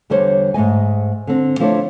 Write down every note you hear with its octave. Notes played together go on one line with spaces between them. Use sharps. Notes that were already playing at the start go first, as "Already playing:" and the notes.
E2 D3 G3 C5 C#5
G#2 A3 D#5 G#5
D3 C4
F3 A3 D4 E4 C5 C#5